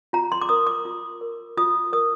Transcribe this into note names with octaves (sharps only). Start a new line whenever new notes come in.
F4 A#5
C6
D6
A#4 D#6
D6
F4
A#4
F4 D#6
A#4 D#6